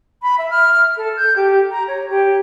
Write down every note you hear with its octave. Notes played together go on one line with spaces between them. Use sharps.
B5
E5
F6
A4
G6
G4
A#5
C#5
G4